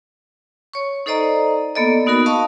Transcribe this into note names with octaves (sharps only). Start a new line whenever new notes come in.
C#5 C#6
D#4 A4 C5 D5 D#5 A#5
A#3 B3 A4 D5 D#5
B3 D#4 F#4 A#4 B5
D#5 F5 A5 C#6 D#6